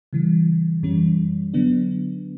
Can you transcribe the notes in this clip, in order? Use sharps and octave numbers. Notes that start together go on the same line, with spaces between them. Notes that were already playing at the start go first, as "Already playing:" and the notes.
C#3 E3 G3
F#2 E3 G3 C#4
D3 F#3 B3 D4